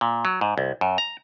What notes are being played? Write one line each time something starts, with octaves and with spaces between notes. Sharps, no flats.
A#2
F#3
G#2
C2
F#2
A#5